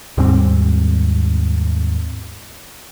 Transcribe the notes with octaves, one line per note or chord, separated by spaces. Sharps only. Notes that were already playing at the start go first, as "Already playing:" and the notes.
D#2 G#2 G3 C4